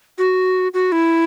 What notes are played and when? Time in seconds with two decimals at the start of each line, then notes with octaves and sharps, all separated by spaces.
0.18 F#4
0.74 F#4
0.92 E4